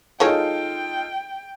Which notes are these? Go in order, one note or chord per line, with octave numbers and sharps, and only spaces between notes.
D#3 G#3 D#4 F4 A4 C#5 G5